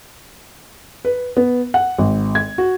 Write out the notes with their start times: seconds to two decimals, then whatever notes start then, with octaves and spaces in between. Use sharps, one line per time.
1.05 B4
1.37 B3
1.74 F#5
1.98 G#1
2.35 G#6
2.58 F#4